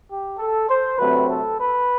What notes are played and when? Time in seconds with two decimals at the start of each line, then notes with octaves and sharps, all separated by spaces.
0.09 G4
0.39 A4
0.69 C5
0.98 D2 C3 F#3 A3 C4 B4
1.29 A4
1.59 B4